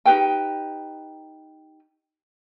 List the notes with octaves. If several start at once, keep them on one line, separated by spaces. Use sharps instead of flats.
D#4 G4 B4 G5